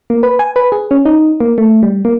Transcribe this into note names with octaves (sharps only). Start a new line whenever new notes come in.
A#3
B4
G#5
B4
G#4
C#4
D#4
A#3
A3
G3
A#3